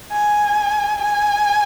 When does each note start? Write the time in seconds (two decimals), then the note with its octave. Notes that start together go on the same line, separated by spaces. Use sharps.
0.12 G#5
1.01 G#5